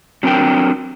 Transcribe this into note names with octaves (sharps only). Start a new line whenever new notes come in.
F#3 C4 D4 A#4 G5